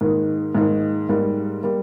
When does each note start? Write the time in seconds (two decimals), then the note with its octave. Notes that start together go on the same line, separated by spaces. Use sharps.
0.01 G#2 D#3 A#3 D#4
0.55 G#2 D#3 A#3 D#4
1.09 G#2 G3 A#3
1.63 G3 A#3